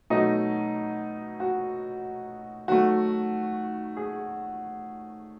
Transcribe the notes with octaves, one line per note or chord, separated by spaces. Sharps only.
B2 F#3 A3 D#4 D#5
F#4
D#3 F#3 A3 F#4
G#4